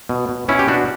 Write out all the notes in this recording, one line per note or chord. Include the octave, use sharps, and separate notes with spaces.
B2
B2
B2 C#4 E4
G4
B2 D4 F#4